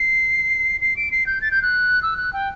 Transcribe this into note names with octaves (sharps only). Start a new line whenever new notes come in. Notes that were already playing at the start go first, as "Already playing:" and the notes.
Already playing: C7
C7
D7
C7
G6
A6
G6
F#6
E6
F#6
G5